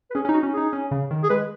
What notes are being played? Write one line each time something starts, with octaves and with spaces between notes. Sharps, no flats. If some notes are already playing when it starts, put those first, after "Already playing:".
B4
C#4 G#4
C#4
D#4
F#4
C#4
D#4 G#4
C#4
C#3
D#3
G#4
G#3 B4